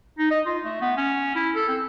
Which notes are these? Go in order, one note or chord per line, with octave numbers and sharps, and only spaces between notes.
D#4
D#5
F4
A3
B3
C#4
E4
A4
C4